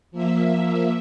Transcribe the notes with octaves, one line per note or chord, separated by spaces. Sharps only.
F3 A#3 E5